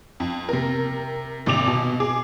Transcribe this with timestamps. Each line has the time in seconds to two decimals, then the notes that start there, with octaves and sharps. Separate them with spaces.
0.20 F2
0.49 C3 A#4
1.46 G#1 C3 D6 F7
1.67 B2
2.00 G#4 D6